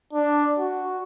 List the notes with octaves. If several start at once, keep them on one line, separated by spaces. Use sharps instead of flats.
D4
F#4